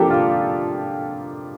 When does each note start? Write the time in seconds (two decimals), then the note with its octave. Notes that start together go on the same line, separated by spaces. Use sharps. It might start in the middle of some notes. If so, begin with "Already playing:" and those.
Already playing: F3 A#3 D4 G4 A4 A#4
0.10 F4